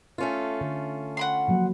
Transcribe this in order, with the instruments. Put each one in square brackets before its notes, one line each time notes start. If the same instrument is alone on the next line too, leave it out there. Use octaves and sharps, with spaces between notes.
[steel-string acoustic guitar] A3 C#4 F4
[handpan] D3 A4
[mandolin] F#5 B5 C6
[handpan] F3 F#3 A#3